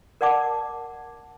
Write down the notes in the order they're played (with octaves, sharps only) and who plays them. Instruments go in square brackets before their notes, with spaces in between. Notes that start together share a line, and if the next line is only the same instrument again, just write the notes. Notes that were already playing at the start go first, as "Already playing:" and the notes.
[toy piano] A#4 D5 F#5 A5 D6